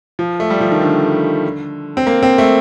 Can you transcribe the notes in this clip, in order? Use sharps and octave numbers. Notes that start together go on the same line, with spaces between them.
F3
A3
G3
F3
D#3
D3
C4
A#3
C4
A3